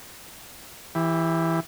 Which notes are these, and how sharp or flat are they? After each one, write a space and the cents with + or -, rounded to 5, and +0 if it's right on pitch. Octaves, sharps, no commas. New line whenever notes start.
E3 +0 G4 +25